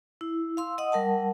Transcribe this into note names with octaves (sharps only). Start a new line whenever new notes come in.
E4
F5 C6 E6
D#5 F#5 D#6
G3 A#4 F#5 A5